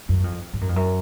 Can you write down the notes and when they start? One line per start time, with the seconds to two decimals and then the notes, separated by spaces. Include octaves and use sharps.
0.09 F#2
0.24 F2
0.53 G#2
0.61 F#2
0.69 F2
0.76 F#2